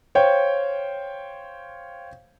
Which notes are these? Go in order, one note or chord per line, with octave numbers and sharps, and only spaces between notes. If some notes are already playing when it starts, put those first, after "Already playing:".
C5 C#5 F5 G5